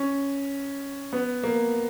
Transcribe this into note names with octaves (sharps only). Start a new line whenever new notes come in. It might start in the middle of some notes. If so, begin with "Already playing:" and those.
Already playing: C#4
B3
A#3